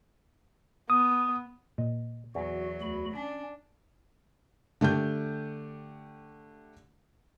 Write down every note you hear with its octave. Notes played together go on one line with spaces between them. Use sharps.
B3 D#6
A#2 D#5
E2 E3 F#3 F#4
D2 F#4 B5
C#4 D4
D3 A3 G4 G6